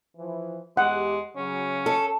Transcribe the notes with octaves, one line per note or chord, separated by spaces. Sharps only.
E3 F3
E2 G#3 G4 F#5
C#3 F#3 C#4
A4